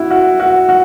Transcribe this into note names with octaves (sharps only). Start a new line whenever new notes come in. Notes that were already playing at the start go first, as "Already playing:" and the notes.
Already playing: E4 F#4
F#4
F#4
F#4